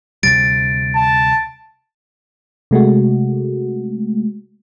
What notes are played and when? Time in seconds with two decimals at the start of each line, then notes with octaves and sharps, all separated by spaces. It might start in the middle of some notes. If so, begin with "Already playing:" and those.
0.23 D2 C3 G3 A6 D7
0.96 A5
2.71 C3 G#3 A3 F#4